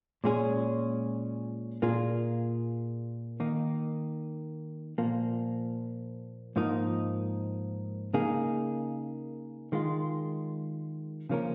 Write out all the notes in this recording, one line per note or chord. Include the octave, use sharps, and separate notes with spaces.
A#2 G#3 C#4 G#4
A#2 A#3 F4 G#4
D#3 A#3 D#4
A#2 F3 A#3
G#2 F3 A#3 D#4
C#3 A#3 D#4 G#4
D#3 G#3 F4
C#3 F3 A#3 C#4 A#4